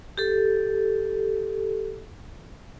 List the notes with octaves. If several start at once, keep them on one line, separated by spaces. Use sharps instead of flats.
G4 A4